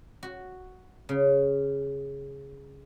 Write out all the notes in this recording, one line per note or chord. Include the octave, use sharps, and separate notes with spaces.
F#4
C#3